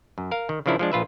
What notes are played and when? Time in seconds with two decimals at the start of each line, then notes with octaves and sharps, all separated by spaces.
0.18 F#2
0.31 A#4 F5
0.49 D#3
0.66 C#3 E3 F3 D4 E4 A#4
0.79 F3 G#3 D4
0.92 A#1 F4 B4 E5